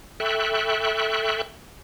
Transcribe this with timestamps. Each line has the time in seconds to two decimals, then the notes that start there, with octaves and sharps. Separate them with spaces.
0.20 A4 E5 G5 B5 C#6 F#6